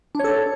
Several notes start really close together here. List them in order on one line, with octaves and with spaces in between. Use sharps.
D4 C#5 A4